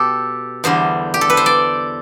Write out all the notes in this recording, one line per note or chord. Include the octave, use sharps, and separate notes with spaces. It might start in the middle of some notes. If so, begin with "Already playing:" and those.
Already playing: B2 G4 A4
E2 D3 G3 C5
G4
A4
B4
C5
D5